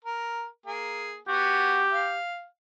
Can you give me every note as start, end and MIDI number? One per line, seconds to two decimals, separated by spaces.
0.04 0.47 70
0.66 1.17 58
0.66 1.17 68
1.28 1.82 59
1.28 1.82 66
1.28 2.17 67
1.92 2.44 77